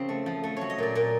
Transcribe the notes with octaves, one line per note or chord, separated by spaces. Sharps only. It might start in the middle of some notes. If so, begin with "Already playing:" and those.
Already playing: C#3 F3 C4
A3
F3
A3
F#3 C#5
D#5
A#2 D5
A#2 A#4